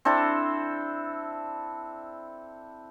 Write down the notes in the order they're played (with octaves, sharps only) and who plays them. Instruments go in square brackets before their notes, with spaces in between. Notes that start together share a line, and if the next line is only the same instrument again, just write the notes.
[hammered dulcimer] C4 D4 E4 A4